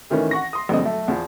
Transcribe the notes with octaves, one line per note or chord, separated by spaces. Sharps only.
D2 D#3 E3 C#4
F#5 C#6 A#6
C6 D#6
A#1 G2 D3 C4 D#5
B1 A3
E2 F3